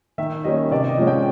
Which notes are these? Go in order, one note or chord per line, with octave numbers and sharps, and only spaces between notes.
D#3 E5
G3 A#3 C#4 D#5
C3 D5
D#5
F3 G#3 C#4
G5